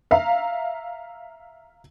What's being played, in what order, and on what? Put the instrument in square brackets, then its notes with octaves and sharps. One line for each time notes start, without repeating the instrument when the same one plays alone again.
[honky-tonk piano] E5 F5 A#5